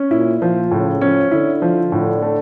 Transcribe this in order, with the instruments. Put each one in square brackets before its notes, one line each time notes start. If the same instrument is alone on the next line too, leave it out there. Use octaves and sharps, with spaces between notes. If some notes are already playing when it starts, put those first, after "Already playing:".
Already playing: [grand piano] C#4
[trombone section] A#2 [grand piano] E4
[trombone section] A#2 [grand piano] F3
[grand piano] A2 [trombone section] C#3
[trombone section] F3 [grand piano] C#4
[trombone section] D3 [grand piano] E4
[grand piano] F3
[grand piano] A2 [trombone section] D3
[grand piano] A3